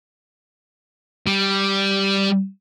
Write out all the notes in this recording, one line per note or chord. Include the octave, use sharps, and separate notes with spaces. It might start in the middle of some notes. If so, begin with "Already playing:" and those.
G3